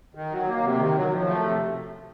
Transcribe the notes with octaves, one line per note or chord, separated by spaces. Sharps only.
D#3
F#3
A#3
C3
D#3
F#3
F3
A3
C3